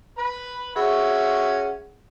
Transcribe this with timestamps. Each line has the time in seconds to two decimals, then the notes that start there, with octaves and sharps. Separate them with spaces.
0.18 B4 B5
0.76 C#4 F#4 G#4 E5 F#5